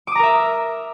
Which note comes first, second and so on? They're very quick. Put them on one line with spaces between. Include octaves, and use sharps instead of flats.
D6 D#6 A#5 A#4 E5